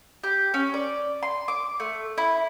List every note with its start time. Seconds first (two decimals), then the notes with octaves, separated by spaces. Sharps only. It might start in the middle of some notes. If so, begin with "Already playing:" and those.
0.24 G4
0.54 C#4
0.74 D5
1.23 C6
1.48 D6
1.80 A3
2.18 E4